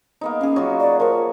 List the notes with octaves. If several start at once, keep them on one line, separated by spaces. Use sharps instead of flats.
A#3 B3 D#4
C#4 G#4 F5
F#3 F4 F#4
D5
F3 A#4 C#5